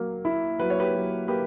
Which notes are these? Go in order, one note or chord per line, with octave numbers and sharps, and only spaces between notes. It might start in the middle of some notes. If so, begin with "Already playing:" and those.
Already playing: F#3 A#3
E4
F#3 B4
C#5
G4 B4
F#3
A#3 G4 B4